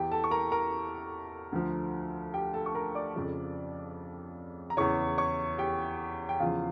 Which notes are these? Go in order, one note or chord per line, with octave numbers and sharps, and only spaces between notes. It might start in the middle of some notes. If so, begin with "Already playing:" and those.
Already playing: E2 E3 G4 G5
A4 A5
C#6
A#4 A#5
A#4 A#5
D2 D3 F3
G4 G5
A4 A5
C#6
A#4 A#5
D5 D6
F2 C#3 F3
A#5
E2 C#3 E3 C#5 C#6
C#5 C#6
G4 G5
G5
E2 C#3 F3 F4 F5